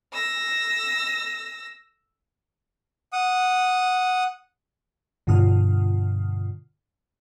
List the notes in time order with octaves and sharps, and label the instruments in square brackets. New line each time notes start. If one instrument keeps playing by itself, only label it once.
[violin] E6 A#6
[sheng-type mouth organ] F#5 D#6
[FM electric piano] G2 B2 D3 F4 D#6 F6